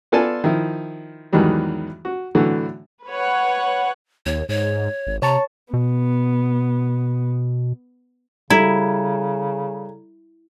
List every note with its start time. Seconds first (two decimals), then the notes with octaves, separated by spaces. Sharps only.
0.12 B3 F4 A4 D5 G#5 A5
0.44 D#3 F3 E4
1.33 E2 G#2 D#3 E3 F#3 G3
2.05 F#4
2.35 A2 D3 E3 F#3 F#4
3.07 B4 C#5 F#5
4.26 D#2 C#5
4.49 G#2 C#5
5.07 G#1
5.22 C3 C#5 A5 A#5 C#6
5.74 B2 B3
8.50 C#3 G3 E4 A4 A#5 G#6